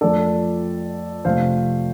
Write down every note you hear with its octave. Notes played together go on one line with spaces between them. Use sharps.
F2 F3 A3 A4 D5
F2 C3 A3 C5 F5